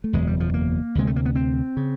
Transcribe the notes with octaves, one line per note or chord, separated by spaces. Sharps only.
A3
F#1 E2 B2 G#3
G3
F3
A#3
D2 C3 G#3
A3
A#3
B3
C4
C#3